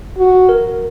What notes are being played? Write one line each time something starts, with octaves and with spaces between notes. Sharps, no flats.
F#4
A#4